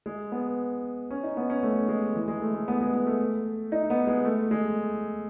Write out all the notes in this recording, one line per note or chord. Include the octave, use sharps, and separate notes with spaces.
G#3
B3
C#4
D#4
B3
C#4
A3
G#3
E3
G#3
A3
A3
B3
G#3
B3
A3
D#4
B3
G#3
A3
G#3